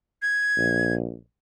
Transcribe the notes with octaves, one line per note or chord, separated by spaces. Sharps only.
G#6
A#1